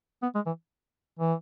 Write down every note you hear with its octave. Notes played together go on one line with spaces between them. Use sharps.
B3
G#3
E3
E3